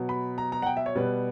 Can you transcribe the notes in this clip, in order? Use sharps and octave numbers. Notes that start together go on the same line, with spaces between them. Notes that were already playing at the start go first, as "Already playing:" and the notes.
Already playing: B2 F#3
B5
A#5
A#5
F#5
G5
E5
C#5
B2 G3 B4